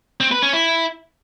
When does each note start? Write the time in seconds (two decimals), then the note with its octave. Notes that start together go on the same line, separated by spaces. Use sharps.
0.20 C4
0.31 B4
0.42 C#4
0.53 E4